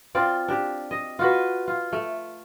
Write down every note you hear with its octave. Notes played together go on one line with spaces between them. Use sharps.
C4 F4 D5
D4 G4
D#5
F4 F#4 B4
F4
A3